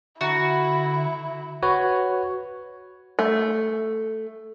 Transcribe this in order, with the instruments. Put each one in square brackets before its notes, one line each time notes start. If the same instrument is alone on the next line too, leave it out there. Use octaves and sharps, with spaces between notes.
[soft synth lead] D3 [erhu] E4 [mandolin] F#4 [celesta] E5 A#5
[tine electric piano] F#4 B4 C#5
[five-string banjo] A3